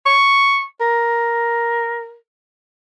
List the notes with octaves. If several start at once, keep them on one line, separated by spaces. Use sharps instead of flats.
C#6
A#4